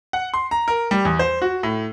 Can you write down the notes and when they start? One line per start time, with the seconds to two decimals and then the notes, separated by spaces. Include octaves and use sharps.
0.13 F#5
0.34 C6
0.51 A#5
0.68 A#4
0.91 G3
1.05 E2
1.19 C5
1.42 F#4
1.63 A2